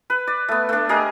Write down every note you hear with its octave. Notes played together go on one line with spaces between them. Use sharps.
B4
D5
A3 B3
A3 D4
G4 G#4 A#4 D#5